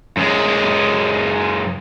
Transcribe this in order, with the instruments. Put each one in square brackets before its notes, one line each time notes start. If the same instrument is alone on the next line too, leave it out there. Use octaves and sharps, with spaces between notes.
[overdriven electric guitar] F#2 G#3